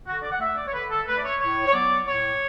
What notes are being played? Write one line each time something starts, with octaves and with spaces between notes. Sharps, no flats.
D3 F#4
D5
F#5
A3 E5
D5
C#5
D3 B4
A4
A3 B4
D5
C#5
A2 C#5
C#5
F#3 B3 D5
A2 C#5